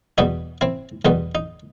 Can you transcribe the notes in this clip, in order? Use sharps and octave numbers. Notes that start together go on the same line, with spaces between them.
E2 B2 G3 B3 D#4 F#4
C4 E4
E2 B2 G3 B3 D#4
D#4